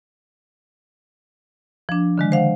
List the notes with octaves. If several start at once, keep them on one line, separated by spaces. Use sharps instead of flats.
F3 D4
D3 D#3 G#3
C5 F5 F#5